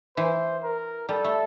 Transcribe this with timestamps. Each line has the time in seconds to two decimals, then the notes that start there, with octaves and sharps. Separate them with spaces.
0.17 E3 C5
0.63 A#4
1.09 G3 A4
1.24 A3